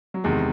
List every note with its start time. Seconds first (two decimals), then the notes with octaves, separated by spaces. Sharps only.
0.14 F#3
0.24 E2 C3 D#3 G#3